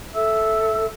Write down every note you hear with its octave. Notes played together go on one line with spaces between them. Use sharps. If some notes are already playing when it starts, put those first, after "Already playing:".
A4 E5 E6